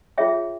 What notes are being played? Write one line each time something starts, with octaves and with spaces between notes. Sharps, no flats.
F4 G#4 C#5 E5 G5